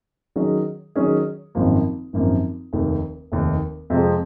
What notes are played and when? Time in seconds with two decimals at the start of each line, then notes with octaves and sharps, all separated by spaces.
0.36 D#3 F#3 C#4 G#4 D#5
0.95 D#3 F#3 C#4 G#4 D#5
1.55 G#1 F#2 F3 A#3
2.13 G#1 F#2 F3 A#3
2.73 F1 D#2 D#3
3.32 F1 D#2 D#3
3.90 F2 C3 F3 G#3